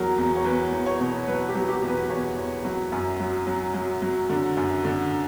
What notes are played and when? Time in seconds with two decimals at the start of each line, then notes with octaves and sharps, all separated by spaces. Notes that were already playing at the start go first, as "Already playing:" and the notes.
Already playing: E2 F#3 A#4
0.18 E2
0.36 C#5
0.45 E2 B4
0.72 E2
0.86 C#5
1.00 B2
1.28 F#3 B4
1.48 G4
1.55 F#3
1.68 G4
1.83 E2
1.89 B4
2.10 E2 C#5
2.37 E2
2.65 F#3
2.92 F#2
3.20 F#3
3.47 F#3
3.74 F#3
4.02 F#3
4.29 D3
4.57 F#2
4.84 D3